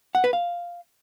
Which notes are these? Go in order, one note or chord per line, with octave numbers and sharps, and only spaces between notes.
F#5
B4
F5